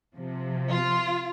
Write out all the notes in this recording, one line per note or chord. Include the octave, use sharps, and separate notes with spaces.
C3 F3
F4